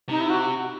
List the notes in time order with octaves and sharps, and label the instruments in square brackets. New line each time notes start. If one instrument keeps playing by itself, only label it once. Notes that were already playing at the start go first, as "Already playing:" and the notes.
[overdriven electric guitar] C3 [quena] D#4
[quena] E4
F#4